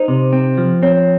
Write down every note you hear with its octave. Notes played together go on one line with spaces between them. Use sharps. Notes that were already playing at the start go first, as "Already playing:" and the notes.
Already playing: D#4 C5
C3
C4
F3
C4 C#5